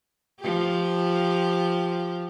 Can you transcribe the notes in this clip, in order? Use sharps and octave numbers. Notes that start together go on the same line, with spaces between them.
F3 G4